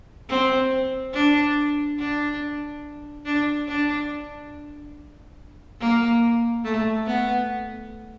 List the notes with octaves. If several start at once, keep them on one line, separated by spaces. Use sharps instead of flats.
C4
D4
D4
D4
D4
A#3
A3
B3